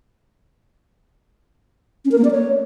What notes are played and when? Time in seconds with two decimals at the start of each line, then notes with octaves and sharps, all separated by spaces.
2.05 C#4
2.11 A#4
2.18 A#3
2.24 D5
2.31 C#5